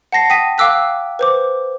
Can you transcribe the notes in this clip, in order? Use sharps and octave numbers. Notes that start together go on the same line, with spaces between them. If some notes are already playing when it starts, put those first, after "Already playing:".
F#5 A5 A#6 C7
G5 D#6 B6 D#7
F5 G5 D6 E6 F#6 B6
B4 C5 D6